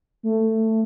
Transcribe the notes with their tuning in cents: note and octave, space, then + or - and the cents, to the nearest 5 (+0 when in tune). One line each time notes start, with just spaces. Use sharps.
A3 +15